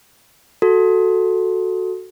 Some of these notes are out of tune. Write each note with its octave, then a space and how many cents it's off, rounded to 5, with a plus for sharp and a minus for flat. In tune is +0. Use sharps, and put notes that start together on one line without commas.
F#4 +0 A4 +0